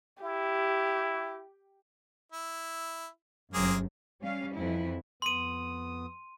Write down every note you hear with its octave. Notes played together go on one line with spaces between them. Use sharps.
E4 G4
E4
G1 F#2 A#3 C4 G#4
G3 C#4 F5
F2 E3 E4
F2 B3 C6 D#6 D#7